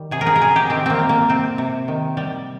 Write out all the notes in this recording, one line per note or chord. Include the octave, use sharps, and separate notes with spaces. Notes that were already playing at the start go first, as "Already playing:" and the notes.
Already playing: D#3 G3
C3 G#4
A#4
G#4
A#4
C3 G#4
G4
D#3 C4
A#3 C4
G3
A#3
C3 C4
C3
D#3
G3